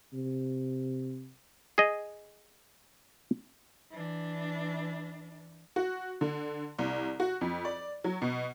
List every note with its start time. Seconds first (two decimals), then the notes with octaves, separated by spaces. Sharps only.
0.13 C3
1.78 G#4 D#5
3.91 E3 D4
5.76 F#4
6.21 D3
6.79 C2
7.20 F#4
7.41 F2
7.65 D5
8.04 F#3
8.22 B2